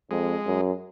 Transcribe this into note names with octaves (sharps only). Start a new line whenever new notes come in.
F2 G#3
F#2